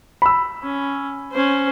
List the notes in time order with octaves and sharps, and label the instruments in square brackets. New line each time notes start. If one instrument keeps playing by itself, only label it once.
[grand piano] B5 E6
[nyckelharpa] C#4
C#4 C5